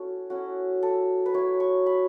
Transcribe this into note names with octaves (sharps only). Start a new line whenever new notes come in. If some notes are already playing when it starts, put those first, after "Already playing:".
Already playing: A3 C#4 E4 F#4 A4
A3 C#4 E4 F#4
A4
B4
F#3 A3 E4 C#5
C#6
B5